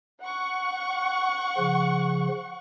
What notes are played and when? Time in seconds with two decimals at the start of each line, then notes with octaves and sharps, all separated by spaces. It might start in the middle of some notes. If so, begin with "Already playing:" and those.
0.22 F#5 C#6
1.58 C#3 F3